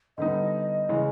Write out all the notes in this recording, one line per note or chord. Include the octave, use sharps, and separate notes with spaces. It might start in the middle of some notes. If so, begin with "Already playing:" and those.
D3 G3 B3 D#4 D#5
C#3 E3 G#3 C#4